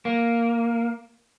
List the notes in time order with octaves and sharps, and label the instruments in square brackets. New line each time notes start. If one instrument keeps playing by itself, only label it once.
[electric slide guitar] A#3